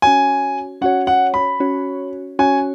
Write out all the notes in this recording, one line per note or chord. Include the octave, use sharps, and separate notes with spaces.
C#4 F#4 C#5 G#5
C#4 F#4 C#5 F#5
F#5
B5
C#4 F#4 C#5
C#4 F#4 C#5 G#5